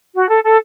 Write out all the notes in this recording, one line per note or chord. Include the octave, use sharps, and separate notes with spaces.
F#4
A4
A4